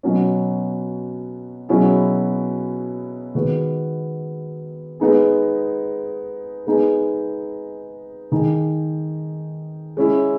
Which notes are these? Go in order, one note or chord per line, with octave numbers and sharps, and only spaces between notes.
B2 F#3 C#4
B2 F#3 C#4 E4 G#4
D#3 G#3 B3 F#4
G#3 B3 D#4 G#4
G#3 B3 D#4 G#4
D#3 G#3 D#4 G#4
G#3 C#4 E4